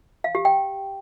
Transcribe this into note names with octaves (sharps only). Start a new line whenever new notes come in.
F5
G4
G5